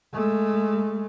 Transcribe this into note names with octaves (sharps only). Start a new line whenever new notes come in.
G#3 A3